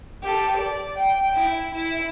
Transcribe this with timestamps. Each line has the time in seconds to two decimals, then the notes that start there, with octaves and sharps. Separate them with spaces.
0.22 G4 A4
0.57 D5
0.98 G5
1.34 E4
1.75 E4